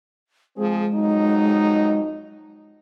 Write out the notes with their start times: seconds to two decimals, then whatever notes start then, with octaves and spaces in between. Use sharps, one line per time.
0.57 F3 G#3 C4 G#4
0.95 F2 F#3 D#4